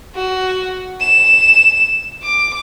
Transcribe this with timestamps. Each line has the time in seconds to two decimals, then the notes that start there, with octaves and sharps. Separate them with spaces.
0.15 F#4
1.01 E7
2.23 D6